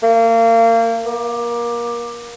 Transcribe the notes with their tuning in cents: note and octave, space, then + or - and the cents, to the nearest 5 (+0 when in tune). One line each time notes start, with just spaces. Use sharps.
A#3 -30
A#3 +25